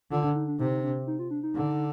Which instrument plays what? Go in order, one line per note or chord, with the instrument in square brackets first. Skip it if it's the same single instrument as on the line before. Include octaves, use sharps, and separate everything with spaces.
[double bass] D3 [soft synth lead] F4
[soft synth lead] D4
D#4
D4
[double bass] C3 [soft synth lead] D#4
[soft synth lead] D#4
D4
D#4
F4
D4
D#4
[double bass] D3